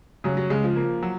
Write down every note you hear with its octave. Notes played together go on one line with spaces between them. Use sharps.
C#3 F#3
F#3
C#3 G#3
F3
A#3
F#3